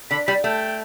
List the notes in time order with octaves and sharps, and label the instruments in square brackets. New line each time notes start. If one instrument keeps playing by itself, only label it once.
[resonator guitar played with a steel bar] D3 [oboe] B5
[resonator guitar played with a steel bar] G3 [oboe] B5
[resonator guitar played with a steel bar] A3 [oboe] G5